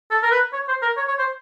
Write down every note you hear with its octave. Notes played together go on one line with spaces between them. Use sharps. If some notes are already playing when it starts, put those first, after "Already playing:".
A4
A#4
B4
C#5
C5
A#4
C#5
C#5
C5